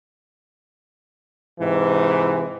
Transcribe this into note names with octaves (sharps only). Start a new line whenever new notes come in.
G#2 C3 E3